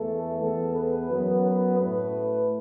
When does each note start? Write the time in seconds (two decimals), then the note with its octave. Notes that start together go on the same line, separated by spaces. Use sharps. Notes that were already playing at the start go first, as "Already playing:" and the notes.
Already playing: E2 E3 A3 A4
0.40 E2 E3 B3 A4
0.75 B4
1.09 F#2 F#3 B3
1.44 B4
1.78 A2 A3 B4